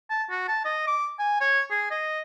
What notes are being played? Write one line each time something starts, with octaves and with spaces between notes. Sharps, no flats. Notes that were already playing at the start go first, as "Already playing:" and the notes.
A5
F#4
A5
D#5
D6
G#5
C#5
G#4
D#5